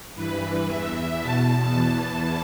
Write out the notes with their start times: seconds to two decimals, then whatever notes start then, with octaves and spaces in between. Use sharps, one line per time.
0.16 G2 E3 B4
0.68 E2 E3 E5
1.21 E2 B2 A5
1.74 E2 E3